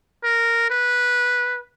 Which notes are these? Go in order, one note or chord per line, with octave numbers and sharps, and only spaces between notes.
A#4
B4